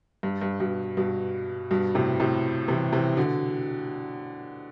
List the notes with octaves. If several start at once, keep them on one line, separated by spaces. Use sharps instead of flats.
G2
G2
G2 B2
G2 B2
G2 B2
A2 C3
A2 C3
C3 E3
C3 E3
B2 D3